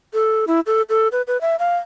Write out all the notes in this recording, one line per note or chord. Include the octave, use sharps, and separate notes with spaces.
A4
E4
A4
A4
B4
B4
E5
F5